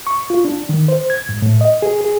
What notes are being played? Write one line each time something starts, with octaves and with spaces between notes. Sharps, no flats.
C#6
F4
D4
D#3
C5
G#6
G#2
A2
D#5
G#4
G#4